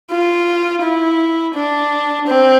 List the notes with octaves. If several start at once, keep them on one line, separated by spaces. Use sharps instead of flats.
F4
E4
D4
C4